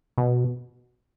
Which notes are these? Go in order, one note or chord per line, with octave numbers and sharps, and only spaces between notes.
B2